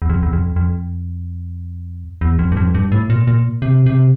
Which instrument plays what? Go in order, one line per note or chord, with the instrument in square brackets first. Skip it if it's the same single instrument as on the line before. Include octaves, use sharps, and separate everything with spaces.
[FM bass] E2
F2
E2
F2
F2
E2
F2
G2
F2
G2
A2
A#2
A#2
C3
C3